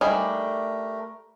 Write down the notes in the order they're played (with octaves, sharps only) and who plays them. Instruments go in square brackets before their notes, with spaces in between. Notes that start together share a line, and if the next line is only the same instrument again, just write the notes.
[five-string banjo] G3 D4 G#4 [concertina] A3 A#4 [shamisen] D#4